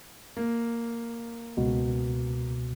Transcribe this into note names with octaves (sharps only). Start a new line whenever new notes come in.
A#3
C#2 B2